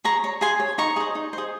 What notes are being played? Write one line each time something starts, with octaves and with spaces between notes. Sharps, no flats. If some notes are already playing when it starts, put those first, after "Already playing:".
G#4 A#5 C#6
C#5
G#4 G#5 C6
C#5
D#4 A#5 C#6
G#4 C5
D#4
G#4 C5